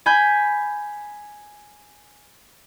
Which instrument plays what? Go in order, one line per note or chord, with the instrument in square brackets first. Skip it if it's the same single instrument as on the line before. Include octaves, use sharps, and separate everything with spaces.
[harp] G#5 B5 G6